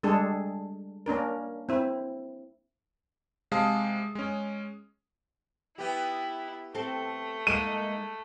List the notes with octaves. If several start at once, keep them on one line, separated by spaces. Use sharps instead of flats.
G3 G#3 D4 G#4 A4
A#3 C#4 D4 A#4
C4 E4
C3 G#3 F5 A5 D#6
G#3 C#4
B3 E4 G4
A3 C4 A4
G#3 A#3 D#4 D#7